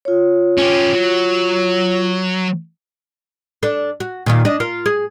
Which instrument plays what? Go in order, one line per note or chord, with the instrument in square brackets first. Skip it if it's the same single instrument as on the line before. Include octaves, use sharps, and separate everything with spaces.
[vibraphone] F4 C#5
[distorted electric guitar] C#4 G4
F#3
[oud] D4 A4
F#4
A#2 D#3 F4
D4 D#5
F4 A#4
G#4